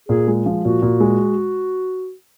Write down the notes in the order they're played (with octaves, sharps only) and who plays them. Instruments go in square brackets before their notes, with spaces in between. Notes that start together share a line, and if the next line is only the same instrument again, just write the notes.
[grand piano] A#2 [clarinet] G#4
[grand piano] G#3
F3
[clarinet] F#4
[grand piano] A#2
A#2
G#3